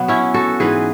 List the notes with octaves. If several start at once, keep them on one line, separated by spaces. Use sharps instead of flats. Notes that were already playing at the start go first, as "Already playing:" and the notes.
Already playing: B2 F#3 B3
C#4 E4
F#4 A4
G#2 E3 G#4 B4